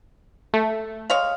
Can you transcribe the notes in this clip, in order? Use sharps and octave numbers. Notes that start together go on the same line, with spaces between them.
A3
G#3 C#5 F5